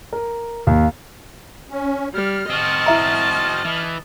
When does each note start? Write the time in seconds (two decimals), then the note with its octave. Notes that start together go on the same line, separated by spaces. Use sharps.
0.13 A#4
0.67 D#2
1.70 C#4
2.15 G3 F6
2.50 C4 F#4 D#5 A5
2.86 E4 E5 A#5
3.65 E3